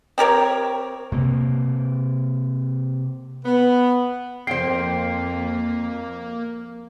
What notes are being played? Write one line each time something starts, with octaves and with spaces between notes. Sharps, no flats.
C4 G4 A#4 C#5
C3 A#3
B3
F2 A#3 C5 G5 C7